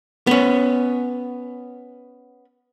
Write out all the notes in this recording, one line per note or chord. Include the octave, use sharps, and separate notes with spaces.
B3 C#4